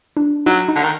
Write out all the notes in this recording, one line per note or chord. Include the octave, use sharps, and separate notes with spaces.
D4
F#3 D#4
D#4
D3
D#3